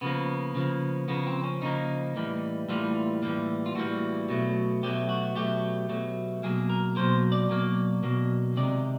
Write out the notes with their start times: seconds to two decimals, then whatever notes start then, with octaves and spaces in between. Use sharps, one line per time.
0.01 C#3 F3 A#3 B3
0.55 C#3 F3 A#3
1.08 C#3 F3 A#3 B3
1.27 C4
1.44 C#4
1.62 C#3 F3 A#3 D#4
2.16 A2 E3 G3 A#3
2.69 A2 E3 G3 A#3 F4
3.23 A2 E3 G3 A#3
3.66 F4
3.75 A2 E3 G3 A#3 F#4
4.29 B2 F#3 A3
4.83 B2 F#3 A3 G4
5.09 F#4
5.36 B2 F#3 A3 G4
5.89 B2 F#3 A3
6.43 B2 F#3 A#3 G#4
6.70 A#4
6.96 B2 F#3 A#3 C5
7.32 D5
7.49 B2 F#3 A#3
8.03 B2 F#3 A#3
8.57 C3 D#3 G#3 D5